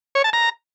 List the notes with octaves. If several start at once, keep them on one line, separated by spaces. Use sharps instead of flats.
C#5
A5
A#5